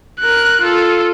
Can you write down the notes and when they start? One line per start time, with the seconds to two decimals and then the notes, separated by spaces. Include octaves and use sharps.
0.20 A#4 F#6
0.62 F4 A4